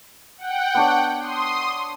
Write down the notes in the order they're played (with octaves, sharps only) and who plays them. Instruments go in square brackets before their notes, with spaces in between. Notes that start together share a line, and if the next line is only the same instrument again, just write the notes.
[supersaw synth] F#5 G5
[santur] B3 D4 C#5
[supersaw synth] C6 D#6